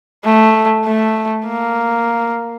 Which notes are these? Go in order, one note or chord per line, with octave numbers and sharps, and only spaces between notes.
A3
A3
A#3